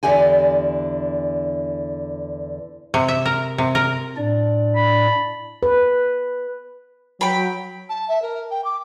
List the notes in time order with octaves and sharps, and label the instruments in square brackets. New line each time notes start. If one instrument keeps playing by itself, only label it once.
[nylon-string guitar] E2 D3 E3 G4 G#5
[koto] C3
E5
A#4
C3
A#4
[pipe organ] A2 D4 D5
[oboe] B5
[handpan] B4
[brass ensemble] F#3 [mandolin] G5 B5
[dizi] A5
E5
A#4
G5
D6